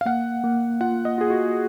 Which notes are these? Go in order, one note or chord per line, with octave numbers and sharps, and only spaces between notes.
F5
A#3 F#5
A#3
F4 F#5
D#5
F4 G#4
F#4